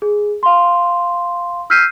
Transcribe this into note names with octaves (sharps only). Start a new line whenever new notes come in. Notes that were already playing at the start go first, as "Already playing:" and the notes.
G#4
F5 C6
E6 F6 G6 B6 C7 D#7